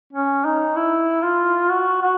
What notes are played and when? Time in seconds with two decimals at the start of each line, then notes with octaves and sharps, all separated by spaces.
0.13 C#4
0.45 D#4
0.76 E4
1.23 F4
1.70 F#4
2.03 F#4